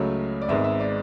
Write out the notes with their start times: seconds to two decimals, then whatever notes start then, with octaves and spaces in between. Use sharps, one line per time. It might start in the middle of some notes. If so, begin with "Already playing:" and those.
Already playing: C#2 C#3 F#3 A3
0.42 D5
0.48 G#1 G#2 G#3 B3 E5
0.64 E5
0.80 D5